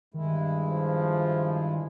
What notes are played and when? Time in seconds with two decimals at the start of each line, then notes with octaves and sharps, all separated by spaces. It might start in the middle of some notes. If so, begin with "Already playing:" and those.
0.14 G2 D#3 G#3 E4
0.71 F3